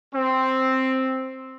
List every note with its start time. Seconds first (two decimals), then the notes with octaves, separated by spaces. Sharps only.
0.15 C4